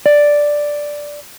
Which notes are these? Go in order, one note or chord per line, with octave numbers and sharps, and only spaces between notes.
D5